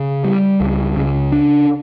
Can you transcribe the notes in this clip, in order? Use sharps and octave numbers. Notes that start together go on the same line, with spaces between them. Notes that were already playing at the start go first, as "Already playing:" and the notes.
Already playing: C#3
G3
C#2
C#3
D4